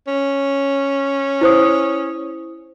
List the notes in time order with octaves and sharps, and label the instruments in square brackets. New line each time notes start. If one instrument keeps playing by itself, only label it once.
[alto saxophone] C#4
[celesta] E4 C5 D#6